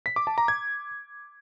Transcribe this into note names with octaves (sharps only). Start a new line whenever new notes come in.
B6
D6
A5
A#5
G#6